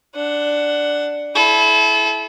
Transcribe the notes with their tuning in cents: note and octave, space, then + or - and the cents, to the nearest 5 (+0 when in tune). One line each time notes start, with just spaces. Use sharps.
D4 +0 F#5 +10
E4 +0 A4 -35